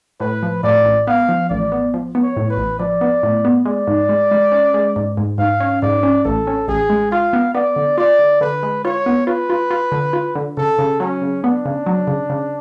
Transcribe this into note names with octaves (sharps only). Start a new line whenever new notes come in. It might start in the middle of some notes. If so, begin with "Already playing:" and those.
A2 B4
F3
A2 D5
A1
B3 F5
F3
A1 D5
B3
F3
B3
C#5
A2
B4
A1
F3 D5
B3
A2
B3
G#3 D5
G#2
G#3
G#3
C#4
G#3
G#2
G#2
G#2 F5
C#4
G#2 D5
C#4
A1 A4
C#4
A1 G#4
G#3
F4 F5
B3
B3 D5
D3
F4 D5
D3
D3 B4
G#3
F4 C#5
B3
F4 B4
F4
F4
D3
F4
D3
C#3 A4
C#3
F#3 C#4
C#3
B3 D4
C#3
F#3
C#3
C#3